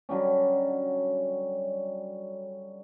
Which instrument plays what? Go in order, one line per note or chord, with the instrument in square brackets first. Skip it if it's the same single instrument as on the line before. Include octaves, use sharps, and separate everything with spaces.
[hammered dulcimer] D3 F#3 G3 C#4